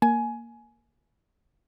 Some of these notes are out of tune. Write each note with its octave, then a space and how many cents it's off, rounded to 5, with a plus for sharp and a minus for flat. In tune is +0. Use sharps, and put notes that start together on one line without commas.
A#3 +0 G#5 +20